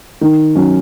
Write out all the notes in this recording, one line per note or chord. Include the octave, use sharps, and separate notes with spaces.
D#3
F#3 C#4